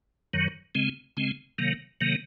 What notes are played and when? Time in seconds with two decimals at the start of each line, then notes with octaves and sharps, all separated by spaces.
0.33 F#2 D#3 F#3
0.75 C#3 G#3 C4
1.17 C#3 G#3 C4
1.58 C3 D#3 F#3 A#3
2.01 C3 D#3 F#3 A#3